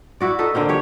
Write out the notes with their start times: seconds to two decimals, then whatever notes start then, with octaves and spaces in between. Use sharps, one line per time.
0.20 E4 F#4 D5
0.39 D#4 F#4 A4 B4
0.54 D3 A#3 C4 D#4
0.68 D4 G4 C#5